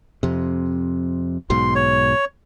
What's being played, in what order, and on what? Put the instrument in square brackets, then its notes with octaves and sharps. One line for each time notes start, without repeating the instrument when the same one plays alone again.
[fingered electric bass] F2 C3
[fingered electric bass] B1 G#2 B2 [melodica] C6
[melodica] C#5